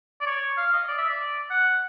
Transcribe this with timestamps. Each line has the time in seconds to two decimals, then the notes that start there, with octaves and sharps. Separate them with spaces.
0.21 D5
0.26 C#5
0.57 F5
0.73 D#5
0.88 D5
0.98 E5
1.09 D5
1.51 F#5